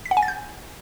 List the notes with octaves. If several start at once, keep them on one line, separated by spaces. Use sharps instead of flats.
B6
F#5
G#5
A6
G6